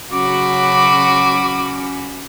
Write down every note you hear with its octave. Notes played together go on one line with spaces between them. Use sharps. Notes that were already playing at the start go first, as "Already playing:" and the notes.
C#3 F#3 C#4 F#4 B5 D6